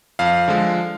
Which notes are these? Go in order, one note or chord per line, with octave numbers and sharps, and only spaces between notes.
F2 F5
D3 F3 G#3